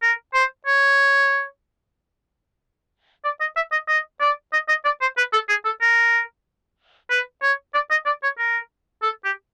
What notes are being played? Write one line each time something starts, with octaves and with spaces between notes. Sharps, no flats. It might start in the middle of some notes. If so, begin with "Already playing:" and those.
A#4
C5
C#5
D5
D#5
E5
D#5
D#5
D5
D#5
D#5
D5
C5
B4
A4
G#4
A4
A#4
B4
C#5
D5
D#5
D5
C#5
A#4
A4
G4